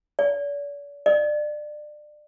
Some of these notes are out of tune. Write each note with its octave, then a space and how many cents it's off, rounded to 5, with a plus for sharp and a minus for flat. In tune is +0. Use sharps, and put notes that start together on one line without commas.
D5 -45
D5 +30